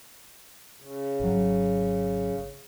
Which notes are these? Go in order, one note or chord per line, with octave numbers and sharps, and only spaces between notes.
C#3
G#1 F#3